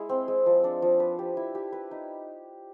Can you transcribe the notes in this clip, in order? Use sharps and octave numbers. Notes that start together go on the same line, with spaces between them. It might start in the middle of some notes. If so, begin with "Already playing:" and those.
Already playing: G#3 E4
C4
G#3
F3
D4
F3
B4
G4
E4
G4
B4
D#4